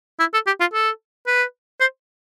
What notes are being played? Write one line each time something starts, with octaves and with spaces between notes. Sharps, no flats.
E4
A4
G4
F4
A4
B4
C5